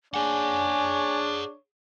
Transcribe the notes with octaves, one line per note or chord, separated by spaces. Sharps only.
D4 G#4 C#5 F#5 G#5